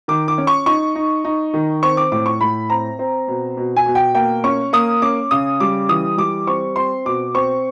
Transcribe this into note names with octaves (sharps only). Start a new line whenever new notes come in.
D#3 D6
D6
C#4
C#6
D#4 C#6
D#4
D#4
D#3
C4 C#6
D6
A2 D6
C#6
A2 B5
C4 A#5
C4
B2
B2
G#5
B2
G5
A#3 G5
C#4 C#6
A#3 D#6
C#4 D6
C#3 D#6
G3 D6
E3 D#6
G3 D6
C4 C#6
C4 C6
B2 D6
C4 C#6